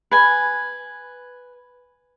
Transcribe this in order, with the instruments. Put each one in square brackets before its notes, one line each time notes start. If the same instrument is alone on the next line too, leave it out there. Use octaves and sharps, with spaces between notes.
[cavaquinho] B4 G#5